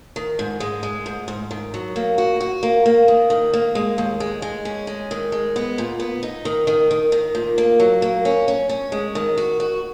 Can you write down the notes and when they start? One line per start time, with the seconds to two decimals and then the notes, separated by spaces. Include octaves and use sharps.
0.16 D#3
0.39 G#2
0.60 G#3
0.83 G#3
1.06 G#2
1.28 G#2
1.51 D#3
1.74 F#3
1.96 A#3
2.18 F#4
2.40 F#4
2.63 A#3
2.86 A#3
3.08 D#3
3.30 D#3
3.53 A#3
3.75 G#3
3.98 D#2
4.20 G#3
4.42 G#3
4.65 C#4
4.87 G#3
5.11 D#3
5.32 G#3
5.56 B3
5.78 A#2
6.00 B3
6.23 D#4
6.45 D#3
6.67 D#3
6.91 D#3
7.12 D#3
7.35 A#2
7.58 A#3
7.80 F#3
8.02 A#3
8.25 C#4
8.48 C#4
8.69 C#4
8.92 G#3
9.15 D#3
9.38 F#4
9.60 F#4